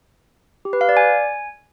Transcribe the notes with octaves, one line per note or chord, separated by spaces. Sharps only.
G4
B4
F5
D5
G#5